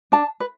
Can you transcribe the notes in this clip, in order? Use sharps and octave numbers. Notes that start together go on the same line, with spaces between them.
D4 A5
B4